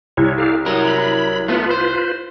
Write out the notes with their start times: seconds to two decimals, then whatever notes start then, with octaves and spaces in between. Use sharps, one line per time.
0.17 C2 C#5
0.38 G4 A4 F5
0.66 F#3 A#4 D#6
0.85 B5
1.48 A3 B3 F4 B4
1.71 C5